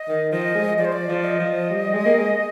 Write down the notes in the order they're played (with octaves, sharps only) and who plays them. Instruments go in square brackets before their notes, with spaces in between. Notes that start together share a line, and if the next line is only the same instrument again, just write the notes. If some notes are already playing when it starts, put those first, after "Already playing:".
Already playing: [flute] D#5
[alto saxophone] D#3
[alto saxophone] F3 [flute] D#5
[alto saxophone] G#3
[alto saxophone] F3 [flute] D5
[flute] C5
D5
[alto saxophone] F3
[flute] D#5
[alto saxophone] F3
G3
G#3
A#3
G#3